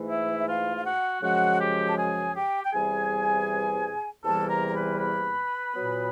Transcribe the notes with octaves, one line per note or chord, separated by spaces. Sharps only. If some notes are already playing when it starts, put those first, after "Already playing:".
Already playing: G#2 E3 A3
E4 E5
E5
F4 F5
F5
F#4 F#5
F#2 C#3 F3 G#3 F#4 F#5
G4 G5
A5
G#4 G#5
G4 G5
G5
E2 C3 E3 G3 G#4 G#5
E2 C3 E3 G3 A#3 A4 A5
A#4 A#5
A#5
B4 B5
B4 B5
A#2 F#3 B3